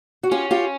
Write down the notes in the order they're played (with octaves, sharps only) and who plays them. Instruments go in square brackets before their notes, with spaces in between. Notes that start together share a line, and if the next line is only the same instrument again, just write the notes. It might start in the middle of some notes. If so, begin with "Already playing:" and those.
[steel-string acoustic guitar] F#4
[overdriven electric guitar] C#4 [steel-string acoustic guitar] F4 G4
[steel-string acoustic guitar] F4 G4